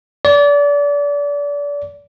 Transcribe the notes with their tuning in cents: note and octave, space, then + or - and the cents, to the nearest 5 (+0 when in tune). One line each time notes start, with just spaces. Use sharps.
D5 -30